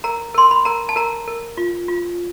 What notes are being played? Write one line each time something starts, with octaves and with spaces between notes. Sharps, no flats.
A#4 A#5
A#4 C6
B5
A#4 A#5
A5
A#4 A#5
A#4
F4
F4